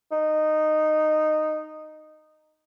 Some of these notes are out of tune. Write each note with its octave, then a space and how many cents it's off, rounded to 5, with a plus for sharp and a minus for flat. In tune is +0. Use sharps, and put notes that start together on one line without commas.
D#4 -10